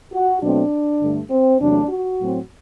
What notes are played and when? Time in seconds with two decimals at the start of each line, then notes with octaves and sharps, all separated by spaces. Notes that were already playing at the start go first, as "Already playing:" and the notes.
0.12 F#4
0.41 B2 F#3 A3 C4 D4
1.00 G2 D3 A3
1.29 C4
1.59 E2 C3 F#3 A3 D4
1.89 F#4
2.18 A2 F#3 C4